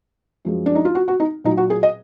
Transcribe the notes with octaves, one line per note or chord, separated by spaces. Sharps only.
F#2 F3 G#3
D4
D#4
F4
F#4
F#4
D#4
A#2 F#3 D#4
F#4
G#4
D#5